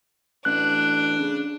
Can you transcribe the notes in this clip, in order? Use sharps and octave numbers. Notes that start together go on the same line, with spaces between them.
A1 D4 F#6
C#3